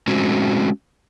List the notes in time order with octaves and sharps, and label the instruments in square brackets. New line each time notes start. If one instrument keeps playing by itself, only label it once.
[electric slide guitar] G#3 A3 C4 C#4 F#4